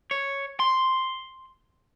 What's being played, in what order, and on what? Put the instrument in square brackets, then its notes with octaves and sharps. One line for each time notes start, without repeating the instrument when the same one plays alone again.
[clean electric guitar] C#5
C6